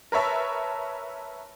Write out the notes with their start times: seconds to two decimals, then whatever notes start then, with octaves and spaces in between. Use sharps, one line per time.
0.12 A#4 B4 C#5 E5 A5